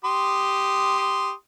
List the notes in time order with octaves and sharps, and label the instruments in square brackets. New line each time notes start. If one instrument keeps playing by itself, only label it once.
[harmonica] G4 C6 D#6